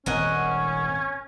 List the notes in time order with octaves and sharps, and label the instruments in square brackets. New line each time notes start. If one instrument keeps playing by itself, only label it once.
[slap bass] D#1 G#1 C4 [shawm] C#4 [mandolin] A#4 D#5 F#5